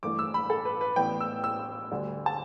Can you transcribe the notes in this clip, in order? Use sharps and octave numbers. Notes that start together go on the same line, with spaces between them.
G1 G2 E3 A3 D6
E6
B5
A4
B4
B4
A1 A2 E3 B3 D4 G5
E6
E6
D2 D3 G3
A5